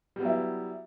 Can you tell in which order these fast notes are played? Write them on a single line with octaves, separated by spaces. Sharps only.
G3 B3 F#3 E4